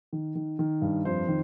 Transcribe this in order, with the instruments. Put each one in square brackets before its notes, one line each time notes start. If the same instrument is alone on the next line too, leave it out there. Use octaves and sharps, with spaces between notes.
[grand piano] D#3
D#3
D#3
G2
F2 C5
D#3